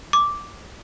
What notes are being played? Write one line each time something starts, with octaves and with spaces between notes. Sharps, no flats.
D6